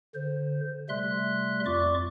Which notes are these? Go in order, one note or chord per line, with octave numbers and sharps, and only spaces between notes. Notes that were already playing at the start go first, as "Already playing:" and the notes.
D3 C5
C3 G3 A3 E5 C6 F#6
F2 F4 D5 C#6 D6